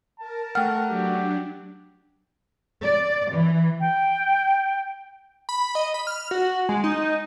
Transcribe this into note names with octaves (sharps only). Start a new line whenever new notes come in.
A#4 A5
A3 F#5 G5 F6
F#3 D4 G4
D5
E3
G5
B5
D#5
B5
F6
F#4
G#3
D#4